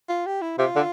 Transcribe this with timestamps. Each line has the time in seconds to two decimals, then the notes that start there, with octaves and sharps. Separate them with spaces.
0.09 F4
0.26 G4
0.42 E4
0.58 C3 F4
0.75 D3